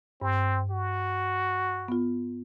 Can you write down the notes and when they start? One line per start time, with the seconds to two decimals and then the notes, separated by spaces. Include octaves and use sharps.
0.22 G2 C4
0.70 F#4
1.88 B3 F4